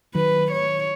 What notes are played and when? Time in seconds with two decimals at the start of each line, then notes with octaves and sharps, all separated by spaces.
0.15 D#3 F#3 B4
0.52 C#5